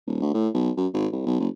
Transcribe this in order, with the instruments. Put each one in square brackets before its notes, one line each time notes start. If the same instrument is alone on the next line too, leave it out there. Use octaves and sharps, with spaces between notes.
[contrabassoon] D#1
D2
A2
B1
F#2
G#1
C2
B1
F#1